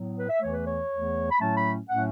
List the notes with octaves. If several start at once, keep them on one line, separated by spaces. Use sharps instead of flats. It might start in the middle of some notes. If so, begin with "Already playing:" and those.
Already playing: A2 F#3 B3
B4
E5
E2 E3 A3 C#5
B4
C#5
E2 E3 A3
B5
A2 F#3 A3 C#4 A5
B5
A2 F#3 A3 C#4 F#5